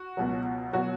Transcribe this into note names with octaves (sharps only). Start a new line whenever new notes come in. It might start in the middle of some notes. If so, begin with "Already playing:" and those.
Already playing: F#4
C#2 B2 F#3
B2 F#3 F#4